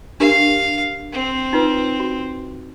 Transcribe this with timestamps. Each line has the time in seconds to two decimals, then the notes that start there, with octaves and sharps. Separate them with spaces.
0.20 D4 G4 A#4 F5
1.13 C4
1.53 D#4 F4 B4
2.00 F#4